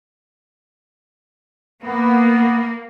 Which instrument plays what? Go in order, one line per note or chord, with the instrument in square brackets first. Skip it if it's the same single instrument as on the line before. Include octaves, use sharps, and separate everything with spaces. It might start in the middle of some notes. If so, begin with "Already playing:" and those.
[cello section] A#3 [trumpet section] B3